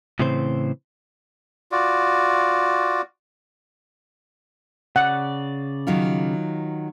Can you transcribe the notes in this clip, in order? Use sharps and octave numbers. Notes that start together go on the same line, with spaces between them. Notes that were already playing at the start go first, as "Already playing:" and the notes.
A2 C#3 E3 C4 C5
F4 F#4 D5
C#3 D5 F#5
D#3 F#3 F4